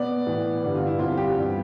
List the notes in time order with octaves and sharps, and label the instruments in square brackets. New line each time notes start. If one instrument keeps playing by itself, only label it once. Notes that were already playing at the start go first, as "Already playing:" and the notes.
Already playing: [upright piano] B2 B3 D5
A2 E3 B3
G2 D3 G3 B3
F4
E4
D2 D3 G3 C4 F4
G4
G2 E3 G3 B3